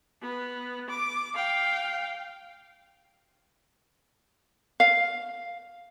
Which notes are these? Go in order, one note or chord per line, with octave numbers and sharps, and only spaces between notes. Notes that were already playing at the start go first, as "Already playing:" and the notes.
B3
D6
F5 G5
F5